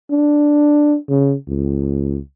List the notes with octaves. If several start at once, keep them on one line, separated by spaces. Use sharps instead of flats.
D4
C#3
C#2